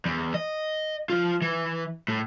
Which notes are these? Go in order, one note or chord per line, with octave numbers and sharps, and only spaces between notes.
E2
D#5
F3 F4
E3
A2